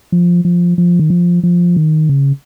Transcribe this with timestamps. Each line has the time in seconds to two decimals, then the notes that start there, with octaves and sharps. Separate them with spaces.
0.12 F3
0.45 F3
0.78 F3
0.99 D#3
1.10 F3
1.43 F3
1.76 D#3
2.09 C#3